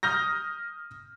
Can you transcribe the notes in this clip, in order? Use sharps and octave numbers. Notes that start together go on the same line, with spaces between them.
D#6 F6 G6 A#6